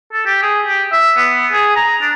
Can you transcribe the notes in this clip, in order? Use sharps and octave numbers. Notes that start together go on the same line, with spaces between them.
A4
G4
G#4
G4
E5
B3
G#4
A#5
D4